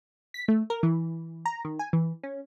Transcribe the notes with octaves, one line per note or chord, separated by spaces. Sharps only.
B6
A3
A#4
E3
A#5
D#3
G#5
E3
C#4